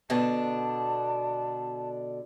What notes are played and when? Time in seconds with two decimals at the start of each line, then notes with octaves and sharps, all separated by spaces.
0.10 B2 D3 B3 D4 B4 A5